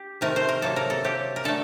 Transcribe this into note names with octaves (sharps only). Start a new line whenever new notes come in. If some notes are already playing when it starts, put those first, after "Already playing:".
Already playing: G4
C3 D#3 A3 A#4
C5
A#4
C3 F#3 A#3 A4
A#4
A4
C3 F#3 A#3 G4
A#4
D3 A3 A4